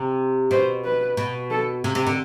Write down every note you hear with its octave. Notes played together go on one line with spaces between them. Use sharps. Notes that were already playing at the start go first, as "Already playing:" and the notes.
Already playing: C3
B2 C5
B4
B2
A4
C3
C3
D3